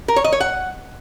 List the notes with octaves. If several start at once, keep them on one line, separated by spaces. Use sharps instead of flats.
A#4
C#5
D#5
C#5
F#5